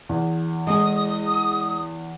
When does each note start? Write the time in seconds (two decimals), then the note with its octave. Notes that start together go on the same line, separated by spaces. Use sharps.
0.09 E2
0.67 G#3 G#4 D#6